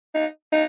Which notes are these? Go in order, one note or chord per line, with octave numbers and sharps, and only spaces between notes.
D#4
D#4